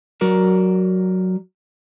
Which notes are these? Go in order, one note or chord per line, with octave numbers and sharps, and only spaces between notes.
F#3 F#4 A#4 D5